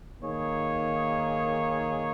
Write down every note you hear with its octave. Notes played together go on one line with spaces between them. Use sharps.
D#3 A#3 D#4 G#4 C#5